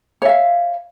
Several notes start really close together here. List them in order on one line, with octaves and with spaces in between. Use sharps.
C#5 E5 F5